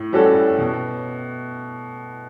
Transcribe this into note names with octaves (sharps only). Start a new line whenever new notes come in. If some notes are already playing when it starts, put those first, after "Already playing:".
Already playing: A2
G3 C#4 F#4 A4
B2